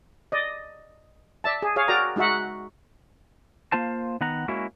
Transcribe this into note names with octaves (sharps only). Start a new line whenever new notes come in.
D5 D#5
D5 E5 A5
G#4
G#4 C#5 F5
F#4 A#4 D5 G5 A#5
G#3 D#4 F#4 E5 F#5
A#3 F4 C5 A5
D#3 B3 F#5 A#5
G#3 A#3 C#4 E4 F#4